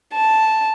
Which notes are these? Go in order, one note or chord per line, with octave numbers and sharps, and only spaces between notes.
A5